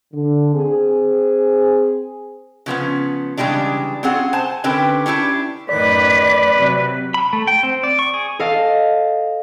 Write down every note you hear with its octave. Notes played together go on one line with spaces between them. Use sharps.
D3
C4 G#4
C#3 F3 B3 C#4
C#3 E3 G3 G#3 D4
C4 C#4 F4 G#4 F#5
C5 G#5 A5
D3 C4 C#4 G4 A#4 B4
C#4 D4 E4 G4
F#2 A2 D#3 B4 D5 B6
C3 F#3
B5
A3
G5
C4
D5
C#6
G#4
A4 D#5 F5